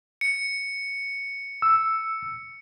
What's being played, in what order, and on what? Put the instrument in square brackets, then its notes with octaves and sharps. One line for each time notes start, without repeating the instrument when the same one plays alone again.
[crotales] C#7
[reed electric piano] E6